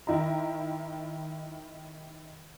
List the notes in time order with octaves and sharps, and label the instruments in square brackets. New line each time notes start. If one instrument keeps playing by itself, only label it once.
[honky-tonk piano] D#3 E4 D#5 A#5